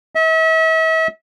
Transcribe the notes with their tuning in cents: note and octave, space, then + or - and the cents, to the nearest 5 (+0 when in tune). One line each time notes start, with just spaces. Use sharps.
E5 -40